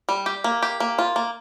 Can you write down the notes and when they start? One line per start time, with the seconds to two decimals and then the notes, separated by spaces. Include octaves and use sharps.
0.09 G3
0.26 G4
0.44 A#3
0.63 G4
0.80 A#3
0.99 F4
1.16 A#3